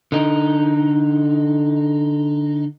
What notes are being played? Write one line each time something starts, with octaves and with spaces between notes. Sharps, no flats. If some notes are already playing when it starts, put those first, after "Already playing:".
D3 D#4